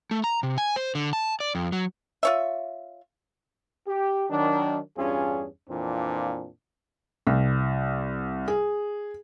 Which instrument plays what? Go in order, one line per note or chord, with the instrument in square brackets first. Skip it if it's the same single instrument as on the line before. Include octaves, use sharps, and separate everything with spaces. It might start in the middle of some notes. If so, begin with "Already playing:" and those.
[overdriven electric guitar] A3
A#5
C3
G#5
C5
D3
A5
D5
F2
F#3
[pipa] F4 C#5 E5
[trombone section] G4
D#3 F#3 D4
E2 G2 C#4 D4 F4 G#4
F2 A#2 E3 F3 C4 D4
[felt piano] C2
G#4